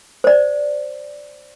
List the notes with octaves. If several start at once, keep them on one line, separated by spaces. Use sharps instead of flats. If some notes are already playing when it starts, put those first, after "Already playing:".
C5 D5